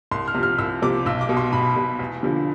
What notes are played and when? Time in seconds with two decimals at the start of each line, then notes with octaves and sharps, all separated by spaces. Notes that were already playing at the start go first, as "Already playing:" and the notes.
0.11 C2 C6
0.28 F6
0.35 C3 F3
0.43 F6
0.58 C2 E6
0.82 C3 F3 D6
1.06 B1 E6
1.21 D6
1.29 B2
1.37 C6
1.53 B1 B5
1.76 B2
1.99 E2
2.23 D3 F3